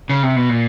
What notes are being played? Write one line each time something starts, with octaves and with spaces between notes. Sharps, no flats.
C#3
C3
B2
A#2